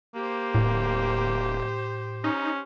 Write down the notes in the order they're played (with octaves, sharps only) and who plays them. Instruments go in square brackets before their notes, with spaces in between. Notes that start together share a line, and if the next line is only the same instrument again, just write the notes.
[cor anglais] A#3 [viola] G4 C5
[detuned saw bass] D1 [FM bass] A2
[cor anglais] C#4 [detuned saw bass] D#4